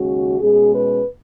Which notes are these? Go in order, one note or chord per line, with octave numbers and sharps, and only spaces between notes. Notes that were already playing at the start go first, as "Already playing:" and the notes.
Already playing: D#2 C#3 G#3 C#4 F#4
B2 G#3 C#4 G#4
B4